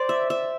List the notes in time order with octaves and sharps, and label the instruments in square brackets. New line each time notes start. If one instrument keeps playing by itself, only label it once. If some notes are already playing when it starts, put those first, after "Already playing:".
Already playing: [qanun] C5 D5
E5
E5